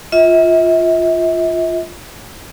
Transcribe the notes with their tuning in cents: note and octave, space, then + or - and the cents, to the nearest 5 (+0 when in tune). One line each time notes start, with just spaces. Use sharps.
F4 +0 E5 -40